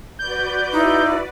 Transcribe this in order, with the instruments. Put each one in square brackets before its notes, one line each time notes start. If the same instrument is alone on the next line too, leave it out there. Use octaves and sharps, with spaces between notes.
[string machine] F#4 B4 D5 [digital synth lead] G6
[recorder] D#4 [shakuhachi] E4